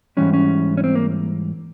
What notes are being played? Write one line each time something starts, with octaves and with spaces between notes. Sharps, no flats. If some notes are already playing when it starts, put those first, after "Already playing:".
G#2 E3 G3 C#4
C#4
C#4
C4
A#3